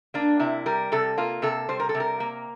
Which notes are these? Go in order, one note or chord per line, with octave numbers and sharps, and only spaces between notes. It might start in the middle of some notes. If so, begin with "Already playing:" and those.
A#3 D4
C3 E4
G3 A#4
C3 A4
A#3 F4
C3 A4
G3 C5
A#4
A4
C3
A#4
A#3